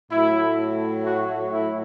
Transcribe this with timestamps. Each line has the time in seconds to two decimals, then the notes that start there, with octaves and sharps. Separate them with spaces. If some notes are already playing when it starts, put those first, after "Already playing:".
0.11 A2 F#3 A3 E4
1.06 F#4
1.54 E4